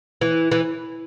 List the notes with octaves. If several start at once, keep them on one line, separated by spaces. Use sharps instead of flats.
E3
E3